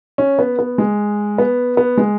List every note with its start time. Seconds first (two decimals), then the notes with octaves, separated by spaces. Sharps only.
0.18 C#4
0.39 B3
0.59 B3
0.78 G#3
1.38 B3
1.77 B3
1.97 G#3